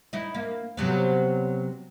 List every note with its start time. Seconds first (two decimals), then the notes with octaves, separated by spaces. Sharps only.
0.13 D#4 E4
0.35 A#3
0.77 C3 F#3 B3